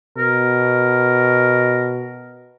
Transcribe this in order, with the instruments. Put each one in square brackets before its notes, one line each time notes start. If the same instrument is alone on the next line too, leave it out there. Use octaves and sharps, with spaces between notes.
[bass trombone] B2 [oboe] A#4